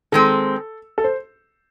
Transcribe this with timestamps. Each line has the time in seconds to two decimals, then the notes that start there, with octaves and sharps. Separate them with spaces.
0.12 D#3 G#3 C4 A4
0.98 A4
1.04 C5